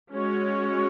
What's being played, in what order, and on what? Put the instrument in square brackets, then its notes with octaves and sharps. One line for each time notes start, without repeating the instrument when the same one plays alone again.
[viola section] G#3 C#4 F#4 C#5